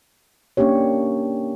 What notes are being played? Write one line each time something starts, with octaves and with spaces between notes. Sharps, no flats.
A#3 C#4 D4 G4 C#5